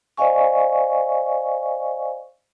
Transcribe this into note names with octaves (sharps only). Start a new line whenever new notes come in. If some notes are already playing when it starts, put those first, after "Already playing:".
C5 D5 D#5 F5 G#5 C#6